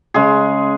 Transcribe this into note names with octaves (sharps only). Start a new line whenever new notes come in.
C#3 G#3 G#4